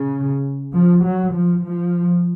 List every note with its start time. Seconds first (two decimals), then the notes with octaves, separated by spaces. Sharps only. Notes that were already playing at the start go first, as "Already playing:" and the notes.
Already playing: C#3
0.74 F3
1.04 F#3
1.33 F3
1.63 F3